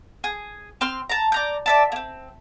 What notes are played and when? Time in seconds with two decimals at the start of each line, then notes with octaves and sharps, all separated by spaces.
0.24 G#4
0.81 C4 C6 F6
1.09 A5 A#5
1.32 D5 A#5 G6
1.66 D5 E5 A5
1.92 A#3 C4